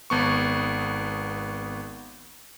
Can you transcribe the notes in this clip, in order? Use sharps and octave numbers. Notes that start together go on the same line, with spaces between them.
G#1 B3 C#6